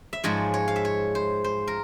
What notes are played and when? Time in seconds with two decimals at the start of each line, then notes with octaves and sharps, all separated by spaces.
0.13 E5
0.24 G#2 F3 G#3 C#5
0.54 C#5
0.68 F5
0.76 E5
0.85 C#5
1.15 C5
1.44 C5
1.67 A#4